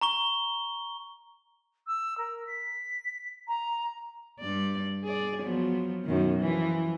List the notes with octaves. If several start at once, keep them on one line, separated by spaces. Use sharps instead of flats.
A#5 C#6 G7
E6
A#4
B6
A#5
G2 D5
G#4 D5
F3 F#3 B3
F#2 B2 D#3
E3 F3